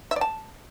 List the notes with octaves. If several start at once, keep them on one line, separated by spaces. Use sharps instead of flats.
E5
D5
A5